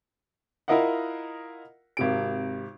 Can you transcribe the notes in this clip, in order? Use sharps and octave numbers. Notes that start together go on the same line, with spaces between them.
E4 F4 A#4 D#5 F5 F#5
G#1 C3 D7